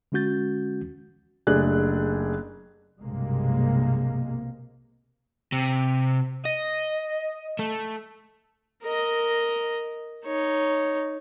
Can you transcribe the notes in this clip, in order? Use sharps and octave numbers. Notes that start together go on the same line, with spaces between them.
D3 G#3 C#4 F#4 G6 A6
F#1 A3 D4 G4 G#4 F#6
B1 G2 C3 G#3 A#3
C3
D#5
A3
A#4 D#5
D#4 C#5